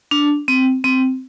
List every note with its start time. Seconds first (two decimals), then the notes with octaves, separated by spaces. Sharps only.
0.11 D4
0.48 C4
0.84 C4